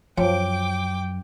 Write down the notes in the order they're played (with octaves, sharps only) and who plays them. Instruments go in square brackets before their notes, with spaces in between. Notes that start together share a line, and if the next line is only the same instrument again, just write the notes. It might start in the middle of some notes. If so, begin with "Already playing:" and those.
[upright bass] F#2 [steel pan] F3 [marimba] C#5 [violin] G5 D6